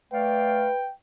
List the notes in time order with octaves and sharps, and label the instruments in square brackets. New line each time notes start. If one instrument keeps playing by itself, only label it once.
[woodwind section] A3 D5 F5 [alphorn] B4 [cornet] G5